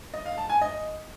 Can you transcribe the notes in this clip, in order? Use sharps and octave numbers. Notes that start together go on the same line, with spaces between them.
D#5
F5
A5
G#5
D#5